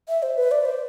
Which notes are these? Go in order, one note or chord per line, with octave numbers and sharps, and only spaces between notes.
E5
C5
B4
D5
C5